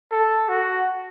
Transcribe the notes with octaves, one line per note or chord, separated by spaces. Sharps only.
A4
F#4